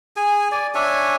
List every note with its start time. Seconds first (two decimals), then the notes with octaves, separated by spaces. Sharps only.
0.16 G#4 G#5
0.52 D5 G#5
0.75 D4 C#5 E5 G#5